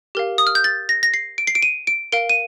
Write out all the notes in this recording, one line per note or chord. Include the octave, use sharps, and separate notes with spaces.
G4 A#4 F5
D#6
F6
G6
A6
A#6
A#6
C7
D7
C7
D7
D#7
D7
A#4 F5 D7
D#7